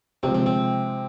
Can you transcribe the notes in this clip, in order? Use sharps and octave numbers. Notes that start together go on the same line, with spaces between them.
C3 F3 G#3 C4
C4
C4